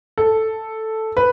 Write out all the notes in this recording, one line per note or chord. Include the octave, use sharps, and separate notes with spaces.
A4
B4